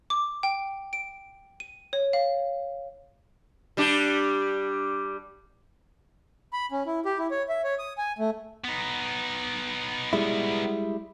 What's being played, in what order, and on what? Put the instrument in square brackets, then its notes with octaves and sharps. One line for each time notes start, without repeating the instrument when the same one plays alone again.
[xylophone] D6
G5
D7
D#7
C#5
F5
[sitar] G3 D4 G4
[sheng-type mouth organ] B5
C#4
E4
G4
E4
C#5
E5
C#5
D#6
G#5
A3
[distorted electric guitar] B3 D#4
[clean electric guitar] G3 G#3 E4